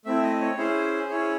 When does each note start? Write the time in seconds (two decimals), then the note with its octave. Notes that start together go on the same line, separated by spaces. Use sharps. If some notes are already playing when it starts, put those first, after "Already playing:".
0.05 A3 C4 E4 E5
0.23 D#5
0.41 C#5
0.57 C#4 E4 G#4 C5
1.09 C#4 E4 G#4 C#5